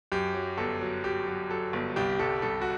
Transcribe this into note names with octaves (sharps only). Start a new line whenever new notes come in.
F#2 G4
F#3
G1 A4
F#3
F#3 G4
F#3
F#3 A4
G1
C2 G4
C2 A4
C2 A4
F#4